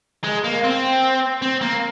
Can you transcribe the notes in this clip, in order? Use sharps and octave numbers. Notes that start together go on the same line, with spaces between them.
G#3
A#3
C4
C4
A#3